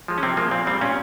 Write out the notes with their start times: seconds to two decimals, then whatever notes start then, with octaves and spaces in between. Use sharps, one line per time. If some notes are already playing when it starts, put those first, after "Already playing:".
0.08 F3 G#3
0.18 C#4
0.23 C3 C4
0.37 F3 G#3 A#3
0.51 A#2 C4
0.67 G3 C4
0.81 A#2 C#4